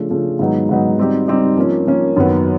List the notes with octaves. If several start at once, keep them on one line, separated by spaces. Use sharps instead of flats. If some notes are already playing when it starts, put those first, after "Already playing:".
Already playing: C#3 F3 A3 D4
C#3 F3 A3 D4
G#2 D#3 F#3 B3 D#4
G#2 D#3 F#3 B3 D#4
G3 C4 D#4 G4
G3 C4 D#4 G4
F3 A#3 C#4
F3 A#3 C#4
F#2 D#3 F#3 B3